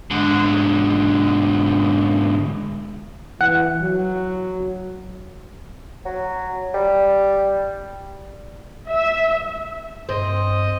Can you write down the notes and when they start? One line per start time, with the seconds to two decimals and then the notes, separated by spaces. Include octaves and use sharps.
0.11 G#2 D3
3.41 E3 F#5
3.82 F#3
6.05 F#3
6.74 G3
8.89 E5
10.09 G2 C4 D#5